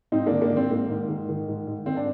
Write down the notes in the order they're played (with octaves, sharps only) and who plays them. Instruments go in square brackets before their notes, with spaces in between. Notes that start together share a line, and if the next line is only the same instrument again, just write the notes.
[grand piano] G#2 C4 D#4
D#3 A#3 D4
A#3 D4
D#3
C4
G#2 A#3
G#2
D#3
D#3
G#2
G#2
D#3 C4
D4